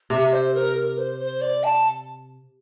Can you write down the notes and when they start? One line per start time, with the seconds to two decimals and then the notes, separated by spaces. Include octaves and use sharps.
0.10 C3 E5
0.33 C5
0.54 A#4
0.76 A#4
0.98 C5
1.19 C5
1.41 D5
1.64 A5